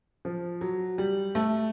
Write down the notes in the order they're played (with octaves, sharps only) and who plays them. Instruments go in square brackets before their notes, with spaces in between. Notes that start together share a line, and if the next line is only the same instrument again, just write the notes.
[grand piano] F3
F#3
G3
A3